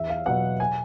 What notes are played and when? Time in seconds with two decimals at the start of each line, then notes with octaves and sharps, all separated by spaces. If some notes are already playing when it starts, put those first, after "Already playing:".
Already playing: E2 E5
0.10 F5
0.26 B2 F#3 B3 F#5
0.60 G#5